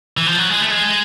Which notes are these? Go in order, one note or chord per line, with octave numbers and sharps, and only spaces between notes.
E3
F3
F#3
G#3
A3
G#3